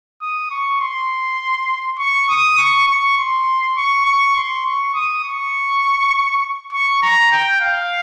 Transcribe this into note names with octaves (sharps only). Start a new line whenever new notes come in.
D#6
C#6
C6
C#6
D#6
C#6
C#6
C6
C#6
C#6
C6
C#6
D#6
C#6
C#6
A#5
G5
F5